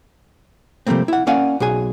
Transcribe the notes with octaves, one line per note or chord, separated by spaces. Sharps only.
C3 F3 G3 A3 A#3 C4
E4 F#5
A#3 C#4 D5 F5 F#5 G#5
B1 F#4 G#4 G#5